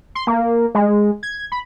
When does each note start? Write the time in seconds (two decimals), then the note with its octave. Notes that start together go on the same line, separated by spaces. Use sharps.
0.15 C6
0.27 A#3
0.75 G#3
1.23 G#6
1.52 B5